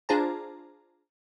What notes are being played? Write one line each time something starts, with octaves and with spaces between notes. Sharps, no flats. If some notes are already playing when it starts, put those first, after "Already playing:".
D4 F4 G#4 C5 A5 A#5